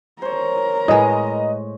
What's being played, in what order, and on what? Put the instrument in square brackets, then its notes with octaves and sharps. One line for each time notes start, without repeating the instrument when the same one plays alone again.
[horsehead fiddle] A#4 A#5 [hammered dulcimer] C5 C#5
[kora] A2 G#3 [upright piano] B4 D#5